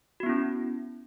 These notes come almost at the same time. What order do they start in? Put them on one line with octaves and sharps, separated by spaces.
F#4 B3 E4 C#4